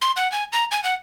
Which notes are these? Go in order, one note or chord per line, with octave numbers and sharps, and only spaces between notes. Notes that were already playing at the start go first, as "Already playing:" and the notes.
C6
F#5
G#5
A#5
G#5
F#5